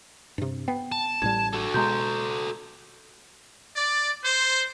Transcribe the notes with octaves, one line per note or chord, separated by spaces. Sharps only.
G2 C3
B3 G5
A5
A1 A2 G3 G#6
F#4 A4
B2 G#3 A#5 C6 G6
D5
C5